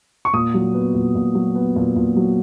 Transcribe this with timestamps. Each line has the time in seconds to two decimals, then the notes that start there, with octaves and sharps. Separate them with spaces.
0.25 C#6
0.33 A#2 D#6
0.54 F#3
0.74 B3
0.94 A#2
1.15 A#2
1.35 F#3
1.55 B3
1.76 A#2
1.96 A#2
2.16 F#3